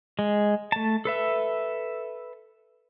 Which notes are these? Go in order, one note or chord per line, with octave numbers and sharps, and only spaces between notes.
G#3
A3 A5
A4 B4 E5